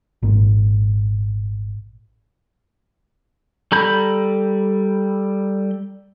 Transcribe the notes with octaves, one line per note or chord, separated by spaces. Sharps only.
G#1 A#2
G3 A4 A#5 B5 G6